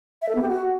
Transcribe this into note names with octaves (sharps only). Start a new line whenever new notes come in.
E5
A4
B3
G4
F#4